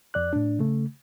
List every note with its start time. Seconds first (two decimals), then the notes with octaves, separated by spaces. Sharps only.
0.14 F2 D5 F#6
0.33 A2 D4
0.59 C#3 A3